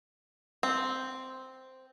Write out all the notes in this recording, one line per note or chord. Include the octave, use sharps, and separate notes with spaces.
C4